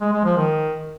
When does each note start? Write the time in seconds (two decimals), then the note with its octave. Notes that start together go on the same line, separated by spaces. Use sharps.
0.01 G#3
0.13 G#3
0.25 F3
0.37 D#3